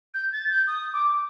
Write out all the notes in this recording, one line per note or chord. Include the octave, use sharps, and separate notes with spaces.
G6
A6
G6
D#6
D6